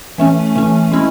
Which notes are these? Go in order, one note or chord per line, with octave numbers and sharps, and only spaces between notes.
E3 A3 C#4
E3 A3 C#4
G#3 C#4 E4